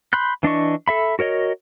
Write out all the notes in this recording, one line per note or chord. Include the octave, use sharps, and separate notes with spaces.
B5 C6 F#6 G6
E3 D4 D#5 C#6
A4 E5 B5
F#4 A#4 C#5 D#5